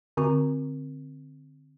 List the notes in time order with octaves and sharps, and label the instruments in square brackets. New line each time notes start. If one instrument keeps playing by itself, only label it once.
[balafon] D3 C4 F#4 A#5 C#6